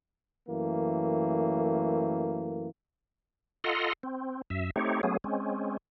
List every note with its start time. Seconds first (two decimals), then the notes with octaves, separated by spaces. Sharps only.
0.49 F#2 E3 A3 A#3
3.64 F4 A4 D#5 F#5 A#5 C6
4.03 C4
4.50 F#2 E5
4.76 A3 C4 D#4 G4 C#5
5.03 F#3 A3 B3 C#4 G#4
5.24 G#3 C4 C#4